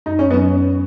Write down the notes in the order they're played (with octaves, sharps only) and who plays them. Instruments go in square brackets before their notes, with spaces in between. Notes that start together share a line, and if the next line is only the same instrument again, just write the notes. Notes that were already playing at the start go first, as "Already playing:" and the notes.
[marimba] F#2 [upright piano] D#4
[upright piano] C#4
[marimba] F#3 C#4 [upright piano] B3